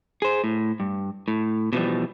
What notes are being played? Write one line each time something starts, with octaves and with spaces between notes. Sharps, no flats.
G#4 C5
A2
G2
A2
B2 E3 F3 G3